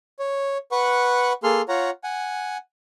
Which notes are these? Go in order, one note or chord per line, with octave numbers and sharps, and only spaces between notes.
C#5
B4 F#5 C#6
A#3 G#4 A4 C6 F6
F4 C#5 F#5 A#5
F#5 G#5